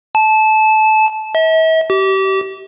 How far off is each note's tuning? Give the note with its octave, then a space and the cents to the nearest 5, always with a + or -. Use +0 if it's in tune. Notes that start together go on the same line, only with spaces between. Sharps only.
A5 -20
E5 -45
G4 -30